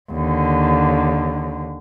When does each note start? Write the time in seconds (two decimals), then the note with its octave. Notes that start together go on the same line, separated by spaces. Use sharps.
0.11 D#2 D3